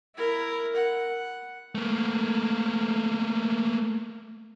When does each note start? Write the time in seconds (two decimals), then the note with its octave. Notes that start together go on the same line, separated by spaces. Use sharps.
0.16 E4 A#4
0.76 F#5
1.75 A3 A#3